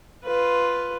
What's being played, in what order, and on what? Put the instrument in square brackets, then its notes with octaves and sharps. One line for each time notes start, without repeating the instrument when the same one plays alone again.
[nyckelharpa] F4 B4